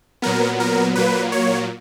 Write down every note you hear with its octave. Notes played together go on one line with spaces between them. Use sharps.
A#2 F#3 B3 A#4
A#4
A#2 F#3 A#3 B4
C#5